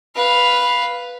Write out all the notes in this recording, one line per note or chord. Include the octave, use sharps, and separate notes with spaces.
B4 F5